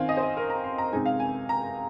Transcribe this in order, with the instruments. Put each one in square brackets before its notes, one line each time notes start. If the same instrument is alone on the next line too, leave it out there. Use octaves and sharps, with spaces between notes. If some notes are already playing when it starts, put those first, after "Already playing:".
Already playing: [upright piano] D#3 C4 F5 G#5
D#5
C5
D#5
A#4
A#5
C6
A#5
C3 G#3 D#4 G#5
F5
G#5
A#5